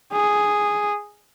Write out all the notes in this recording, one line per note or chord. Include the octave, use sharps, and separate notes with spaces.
G#4